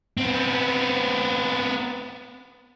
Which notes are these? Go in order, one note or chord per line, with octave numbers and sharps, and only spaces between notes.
B3 C4